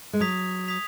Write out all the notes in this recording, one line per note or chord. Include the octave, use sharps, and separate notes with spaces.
G#3
F#3 D#6 G#6 B6 F7
D#6 G#6 B6 F7